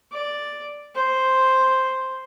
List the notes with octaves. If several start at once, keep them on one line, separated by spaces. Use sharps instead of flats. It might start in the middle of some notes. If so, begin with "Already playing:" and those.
D5
C5